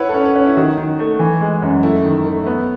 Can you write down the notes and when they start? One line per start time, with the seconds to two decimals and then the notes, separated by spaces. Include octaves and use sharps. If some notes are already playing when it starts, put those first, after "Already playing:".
Already playing: E4 B4 C#5 F#5
0.09 A4
0.14 C#4
0.25 B4
0.36 C#4
0.46 E4
0.57 D#3 F#4
0.78 D#3
0.99 A3
1.19 E3
1.41 G#3
1.62 F#2
1.83 A3 E4
2.04 D#3
2.25 A3
2.46 B3